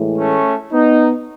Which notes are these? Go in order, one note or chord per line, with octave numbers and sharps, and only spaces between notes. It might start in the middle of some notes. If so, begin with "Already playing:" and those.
Already playing: A2 E3 G#3
A3 C#4
B3 D#4